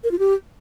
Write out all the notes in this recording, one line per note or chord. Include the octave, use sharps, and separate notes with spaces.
A#4
F4
G4